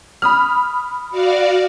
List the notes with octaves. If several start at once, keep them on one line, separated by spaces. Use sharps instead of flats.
B5 D#6 F6
F#4 D5 F5